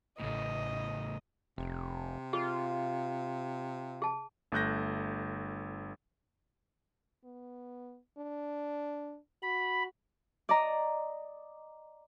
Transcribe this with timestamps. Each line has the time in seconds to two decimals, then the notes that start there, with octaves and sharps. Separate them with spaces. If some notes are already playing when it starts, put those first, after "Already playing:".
0.20 A1 A2 C#3 A3 D#5
1.58 F1 C3
2.33 F4 G#4
4.02 G#4 A5
4.52 G1 A3 F#6 G6 A#6
7.25 B3
8.18 D4
9.42 F#4 B5
10.49 D5 D#5 A#5